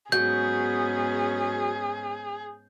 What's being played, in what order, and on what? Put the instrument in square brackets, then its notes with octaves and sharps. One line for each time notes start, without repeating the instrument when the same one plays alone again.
[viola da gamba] G#2 B3 C#4 [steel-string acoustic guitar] F#3 [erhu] G#4 [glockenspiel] G6